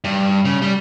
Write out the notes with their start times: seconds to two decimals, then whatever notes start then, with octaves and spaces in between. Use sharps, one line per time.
0.04 G2
0.45 C#3
0.62 G3